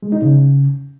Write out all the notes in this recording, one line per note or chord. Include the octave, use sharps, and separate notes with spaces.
G#3
D#4
C#3